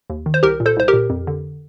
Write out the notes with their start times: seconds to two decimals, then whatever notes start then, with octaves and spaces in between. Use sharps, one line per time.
0.10 D#2
0.26 D#3
0.34 C5
0.43 C2 G4 A#4
0.60 A#2
0.66 A4 C5
0.77 C2 C5
0.88 G4 A#4
0.93 A#2
1.10 F2
1.27 D3